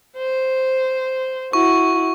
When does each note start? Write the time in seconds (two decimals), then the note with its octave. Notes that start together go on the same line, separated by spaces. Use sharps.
0.17 C5
1.53 E4 F#4 C#6